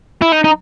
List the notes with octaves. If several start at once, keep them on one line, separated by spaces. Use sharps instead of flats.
E4
D#4
D#4